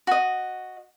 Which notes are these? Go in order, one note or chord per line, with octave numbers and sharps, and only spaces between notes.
F#4 D#5